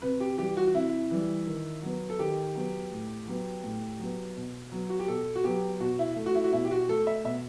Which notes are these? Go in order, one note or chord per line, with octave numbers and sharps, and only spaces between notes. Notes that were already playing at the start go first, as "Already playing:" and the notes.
C3 B4
G4
E3 G3 G4
F#4
F#4
C3 E4
E3 G3
D#3
F#3 B3
A4
D#3 G4
F#3 B3
A2
F#3 B3
A2
F#3 B3
B2
F#3 B3
F#4
G4
B2 A4
F#4
F#3 B3 G4
B2 F#4
E4
A3
F#4
E4
F#4
B2 E4
G4
F#4
A3 A4
E5
B2 E5